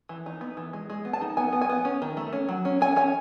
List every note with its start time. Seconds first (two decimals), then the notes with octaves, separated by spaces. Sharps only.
0.09 E3
0.26 D#4
0.41 B3
0.57 E3
0.73 G#3
0.90 G#3
1.05 B3
1.13 A5
1.21 D#4
1.37 B3 G#5
1.53 B3
1.61 G#5
1.69 B3
1.85 C#4
2.02 D#3
2.17 A3
2.33 C#4
2.49 F#3
2.65 C#4
2.81 C#4 G#5
2.96 C#4 G#5